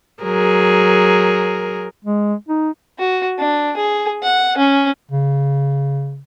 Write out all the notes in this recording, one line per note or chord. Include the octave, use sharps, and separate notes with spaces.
F#3 G#4 A#4
G#3
D#4
F#4
D4
G#4
F#5
C#4
C#3